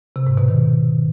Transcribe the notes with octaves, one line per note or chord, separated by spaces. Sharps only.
C3
G#2
B2
D#3